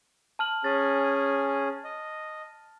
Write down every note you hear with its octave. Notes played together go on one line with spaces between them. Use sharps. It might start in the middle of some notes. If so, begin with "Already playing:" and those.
A5 F6 F#7
C#4 G#4 A6
D#5